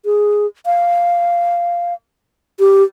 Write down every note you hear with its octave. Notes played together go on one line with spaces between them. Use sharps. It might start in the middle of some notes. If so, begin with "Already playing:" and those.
G#4
F5
G4